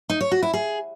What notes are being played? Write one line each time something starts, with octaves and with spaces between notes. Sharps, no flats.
D#4
C#5
F#4
E4
G#4